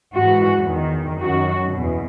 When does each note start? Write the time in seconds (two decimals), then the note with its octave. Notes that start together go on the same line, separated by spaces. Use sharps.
0.15 G#2 E3 F#4
0.68 E2 D#3
1.19 F#2 D#3 F#4
1.72 E2 B2